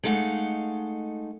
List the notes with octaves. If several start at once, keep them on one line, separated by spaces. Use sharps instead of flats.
G#3 A3 D#4 F5 F#5